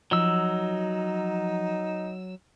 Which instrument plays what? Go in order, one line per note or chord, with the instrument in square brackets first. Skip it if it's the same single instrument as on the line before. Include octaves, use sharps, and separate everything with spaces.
[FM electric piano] F3 [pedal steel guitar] F#3 E6 [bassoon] D#4